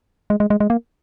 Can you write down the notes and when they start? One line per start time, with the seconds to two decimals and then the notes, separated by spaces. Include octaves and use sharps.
0.30 G#3
0.40 G#3
0.50 G#3
0.60 G#3
0.70 A#3